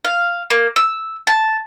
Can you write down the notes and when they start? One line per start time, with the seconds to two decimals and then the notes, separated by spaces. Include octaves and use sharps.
0.05 F5
0.50 A#3
0.76 E6
1.27 A5